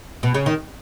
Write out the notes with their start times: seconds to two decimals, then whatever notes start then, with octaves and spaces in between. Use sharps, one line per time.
0.23 B2
0.34 C#3
0.46 D#3